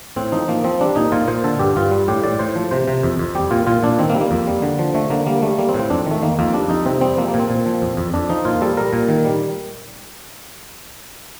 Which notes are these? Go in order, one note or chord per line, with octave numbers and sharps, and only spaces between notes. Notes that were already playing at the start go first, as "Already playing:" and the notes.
A2 C4
F3 D#4
F3 A#3
F3 C4
G3 D4
A#2 D#4
A#2 F4
A#2 C5
D3 A4
G2 G4
G2 F4
G3
A2 G4
A2 D5
A2 C5
F3
C3 C5
C3
F2
F2
G3 G4
A#2 F4
A#2 F4
A#2 D4
D#3 C4
A#3
G3
A#3
F2
G3
D3
F3
D3 A3
D3 A#3
G3 A#3
G3 A3
G3 A#3
C4
A2
C4
F2 D4
D#3 A3
D#3 A#3
F2 A#3
G3 D4
F2 D#4
C3 C4
G3 C4
F3 A#3
A#3
A#2
C4
A#2
F3
F2
F2
F2 D4
F3 D#4
A#2 F4
G3 A4
G3 A#4
A#2
D#3
G3